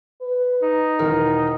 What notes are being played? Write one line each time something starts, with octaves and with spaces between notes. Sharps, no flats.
B4
D#4
E1 D#3 A#4